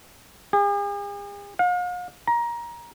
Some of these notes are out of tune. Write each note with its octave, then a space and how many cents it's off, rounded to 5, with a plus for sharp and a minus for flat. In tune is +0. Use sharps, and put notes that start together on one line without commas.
G#4 -45
F5 +45
A#5 +20